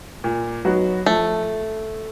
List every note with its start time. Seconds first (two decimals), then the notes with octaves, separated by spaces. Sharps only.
0.24 A#2
0.65 F#3 B3 D#4 F#4
1.06 F3 A3